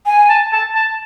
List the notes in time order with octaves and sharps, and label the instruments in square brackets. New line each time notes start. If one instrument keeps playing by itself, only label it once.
[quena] G#5
[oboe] A5
A5
A5